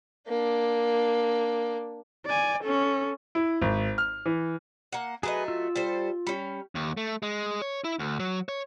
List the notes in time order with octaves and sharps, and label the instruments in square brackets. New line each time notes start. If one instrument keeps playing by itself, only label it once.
[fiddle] A#3 D4
[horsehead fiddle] D5 G#5
C#4 A4
[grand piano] E4
G#1
F6
E3
[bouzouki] A#3 F#5
[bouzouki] F#3 A3 D#5 [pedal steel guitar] G#4 B4
[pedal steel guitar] F4 E6
[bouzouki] G3 A4 C5
G3 C#4
[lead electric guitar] D#2
A3
G#3
C#5
E4
D2
F#3
C#5